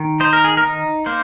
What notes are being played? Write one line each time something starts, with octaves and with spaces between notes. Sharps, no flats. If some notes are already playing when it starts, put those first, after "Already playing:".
Already playing: D#3
D#4 C5
A#4
G#4
A#4
D#4
A#3 C5